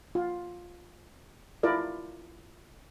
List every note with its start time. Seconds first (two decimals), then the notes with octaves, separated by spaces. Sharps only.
0.15 F4
1.63 E4 F4 A#4 D5